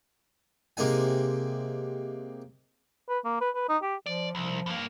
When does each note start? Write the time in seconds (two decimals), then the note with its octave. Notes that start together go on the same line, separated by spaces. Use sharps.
0.77 C3 G#3 A#3 D#4 G#5
3.08 B4
3.24 A#3
3.41 B4
3.55 B4
3.69 D#4
3.82 G4
4.06 F3 D5
4.35 C2 F3
4.66 G2 A#3